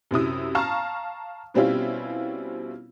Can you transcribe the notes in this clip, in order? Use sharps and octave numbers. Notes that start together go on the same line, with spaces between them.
F#2 C3 E4 D#6
F5 A5 A#5 C#6 F6
B2 G3 C4 C#4 E4 F4